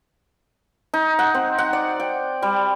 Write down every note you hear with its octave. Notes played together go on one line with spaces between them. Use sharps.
D#4
F#5
C4
F#5
D5
G5
G3